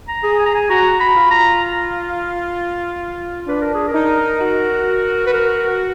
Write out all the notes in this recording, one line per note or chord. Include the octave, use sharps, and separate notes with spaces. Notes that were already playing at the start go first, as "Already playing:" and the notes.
A#5
G#4
G#5
A#5
G#5
F#4 A#5
B5
F4
A#5
D4 B4
A#4
G#4
A#4
D#4
F#4
B4
A#4